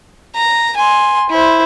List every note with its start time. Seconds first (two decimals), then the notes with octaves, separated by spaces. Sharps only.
0.35 A#5
0.76 G#5 C6
1.30 E4 C5